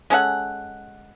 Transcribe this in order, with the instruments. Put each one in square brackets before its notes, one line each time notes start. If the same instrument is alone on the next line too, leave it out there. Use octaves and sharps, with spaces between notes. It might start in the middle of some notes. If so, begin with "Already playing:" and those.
[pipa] G#3 C#4 A4 F#5